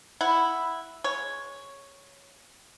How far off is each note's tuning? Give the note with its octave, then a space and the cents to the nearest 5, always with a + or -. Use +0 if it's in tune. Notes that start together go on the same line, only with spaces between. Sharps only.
E4 +0 F#5 +0
G#3 +5 C#5 +0